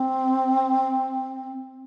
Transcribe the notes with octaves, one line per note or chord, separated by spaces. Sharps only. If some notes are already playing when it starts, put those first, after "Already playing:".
Already playing: C4